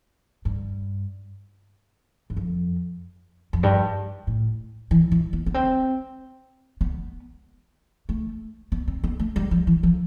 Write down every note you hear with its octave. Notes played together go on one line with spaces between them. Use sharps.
G2
G2
F2
F2
G2
A2
E3
E3
B3
B3
C4
B3
A3
B3
C4
B3
A3
G3
F3
E3
F3